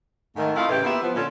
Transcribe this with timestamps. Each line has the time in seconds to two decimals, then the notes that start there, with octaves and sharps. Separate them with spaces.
0.36 G#2 D#3 A3
0.56 A3 C4 E4 F4 D#5 F5
0.69 A2 C#3 E3 G4
0.83 A#3 B3 E4 F4 G4 E5
1.03 F3 B3
1.15 A#2 D3 C#4 F4 A4